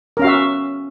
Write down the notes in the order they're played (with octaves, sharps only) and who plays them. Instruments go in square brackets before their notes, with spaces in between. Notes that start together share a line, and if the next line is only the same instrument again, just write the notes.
[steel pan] A#4
C#4
F5
F#4
E5